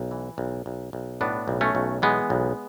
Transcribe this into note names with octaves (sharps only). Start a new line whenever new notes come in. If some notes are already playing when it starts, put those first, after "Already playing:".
Already playing: B1
E3
B1
B1
B1
A2 B3 D4
B1
A3 C#4
B1
E3 G#3 B3
B1